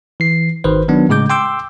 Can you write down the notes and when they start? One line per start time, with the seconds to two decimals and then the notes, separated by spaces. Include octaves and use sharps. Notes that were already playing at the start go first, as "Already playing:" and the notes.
0.20 E3 C7
0.64 G#1 D#3 B4 C5
0.88 D#3 F#3 B3 D4
1.09 A2 C#3 G#3 D6 G6
1.30 G5 C6 D6 E6 G6